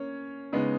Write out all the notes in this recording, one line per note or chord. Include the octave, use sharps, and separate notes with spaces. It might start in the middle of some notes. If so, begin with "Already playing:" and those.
Already playing: A#3 C#4 C#5
C#3 G#3 B3 D#4